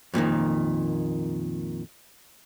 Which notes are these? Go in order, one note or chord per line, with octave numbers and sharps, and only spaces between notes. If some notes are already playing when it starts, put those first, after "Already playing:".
F2 A#2 D3 D#3